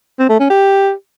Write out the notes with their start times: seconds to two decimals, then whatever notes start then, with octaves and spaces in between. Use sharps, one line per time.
0.19 C4
0.29 A3
0.40 C#4
0.50 G4